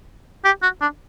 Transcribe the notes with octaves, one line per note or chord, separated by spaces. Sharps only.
G4
F#4
D4